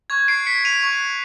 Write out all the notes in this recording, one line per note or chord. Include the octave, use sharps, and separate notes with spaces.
C#6 F#6 G#6
C7 D7
B6 C#7
D#7 F7
C#6 F#6